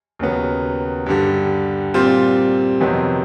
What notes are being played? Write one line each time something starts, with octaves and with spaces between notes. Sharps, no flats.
D#2 C#3 F#3 B3
G2 D3 G3
A#2 G3 C4 F4
F2 C3 D#3 F#3 B3